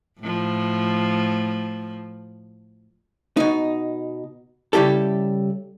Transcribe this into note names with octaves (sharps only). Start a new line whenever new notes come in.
A2 F3
B2 D#4
C#3 G3 E4 G4 A4